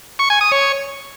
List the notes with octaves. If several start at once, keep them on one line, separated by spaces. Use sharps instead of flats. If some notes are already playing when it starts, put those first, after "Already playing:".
C#6
G#5
D#6
C#5